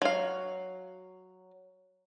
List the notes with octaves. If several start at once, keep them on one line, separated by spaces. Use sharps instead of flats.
F#3 F5